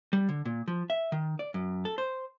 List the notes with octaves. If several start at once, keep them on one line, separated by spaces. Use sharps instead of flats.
G3
D3
A#2
F3
E5
D#3
D5
F#2
A4
C5